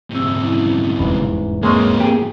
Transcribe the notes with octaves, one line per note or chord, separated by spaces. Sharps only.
D2 G#2 C3 E6
G3 C#4 E4
F1 E2 G#2 B4 B5
G#3 A#3 C4 C#4 D#5 A#5
G4 G#4